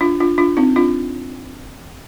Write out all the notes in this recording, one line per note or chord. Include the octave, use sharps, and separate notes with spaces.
D4 F4
D4 F4
D4 F4
C4 D#4
D4 F4